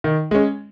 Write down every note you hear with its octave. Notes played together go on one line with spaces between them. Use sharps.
D#3
G#3 C#4